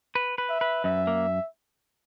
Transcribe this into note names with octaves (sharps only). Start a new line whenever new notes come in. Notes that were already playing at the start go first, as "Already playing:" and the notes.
B4
B4
E5
B4
F#2 E5
A#3